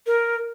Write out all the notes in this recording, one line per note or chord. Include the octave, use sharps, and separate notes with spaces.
A#4